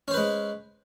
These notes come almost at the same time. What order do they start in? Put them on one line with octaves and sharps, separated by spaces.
C#4 C5 B4 G#3